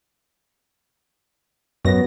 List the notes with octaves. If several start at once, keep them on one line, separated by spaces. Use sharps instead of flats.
F#2 F#3 B3 A#6